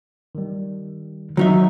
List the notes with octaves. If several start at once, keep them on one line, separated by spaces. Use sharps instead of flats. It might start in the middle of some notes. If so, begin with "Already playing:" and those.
D#3 G3
D#3 F#3 D#4 E5